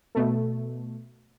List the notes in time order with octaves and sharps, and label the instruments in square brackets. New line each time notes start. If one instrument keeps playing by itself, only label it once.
[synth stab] B2 A3